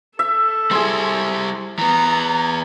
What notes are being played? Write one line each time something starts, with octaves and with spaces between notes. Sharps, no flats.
A4 E5
G3 E4 G#4 C6
E3 B3 A#5